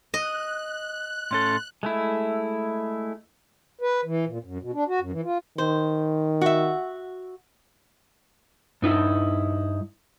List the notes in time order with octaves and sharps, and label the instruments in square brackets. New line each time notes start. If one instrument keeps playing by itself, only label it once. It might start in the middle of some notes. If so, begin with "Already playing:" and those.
[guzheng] D#5 [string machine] F#6
[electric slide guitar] A2 C#4 A4 [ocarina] C6
[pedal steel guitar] G#3 A3 E4
[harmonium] B4
E3
A#2
F#2
B2
D4
F#4
F#2
E3
F4
[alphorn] D#3 [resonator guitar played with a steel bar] C5
[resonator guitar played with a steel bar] F#4 E5
[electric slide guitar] G2 D#4 E4